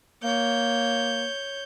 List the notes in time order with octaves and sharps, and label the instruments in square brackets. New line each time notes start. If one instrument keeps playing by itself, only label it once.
[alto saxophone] A#3 [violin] C#5 G6